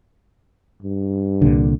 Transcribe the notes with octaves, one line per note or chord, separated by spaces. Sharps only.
G2
C2 A#2 D3